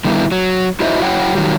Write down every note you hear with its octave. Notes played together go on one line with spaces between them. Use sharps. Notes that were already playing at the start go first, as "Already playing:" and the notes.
D3 D#3 G3 B3 D#4 E4
F#3
D#4 E4 F#4 C5 D#5 E5
F#3 E4 C#5 F#5 G5
D#3 F#3 G3